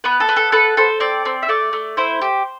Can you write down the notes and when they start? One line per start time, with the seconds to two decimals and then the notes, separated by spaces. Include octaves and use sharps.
0.04 B3 B4
0.20 A4
0.29 B3
0.36 A4
0.52 A4 B4
0.77 A4 C5
1.00 C4 D5
1.25 C4
1.42 E5
1.48 A3 D5
1.73 A3
1.97 E4 C5
2.21 G4